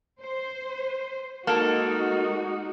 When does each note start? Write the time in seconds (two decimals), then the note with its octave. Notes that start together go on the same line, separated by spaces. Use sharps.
0.20 C5
1.47 G#3 A#3 D#4 F#4 A4